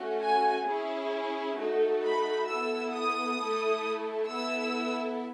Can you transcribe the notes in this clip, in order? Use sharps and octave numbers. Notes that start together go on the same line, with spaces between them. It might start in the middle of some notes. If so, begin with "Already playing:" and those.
Already playing: A3 C#4 F#4
G#5
C#4 E4 G#4
A3 D#4 F#4 A4
B5
B3 E4 A4 E6
D#6
A3 E4 A4
B3 E4 A4 E6